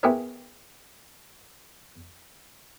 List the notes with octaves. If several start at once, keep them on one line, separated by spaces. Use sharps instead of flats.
B3 E4 G4 G#4 A#4 C#5